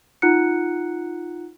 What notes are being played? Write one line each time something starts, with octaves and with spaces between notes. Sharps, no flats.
D#4 F4 F#5 A#5 F#6 C#7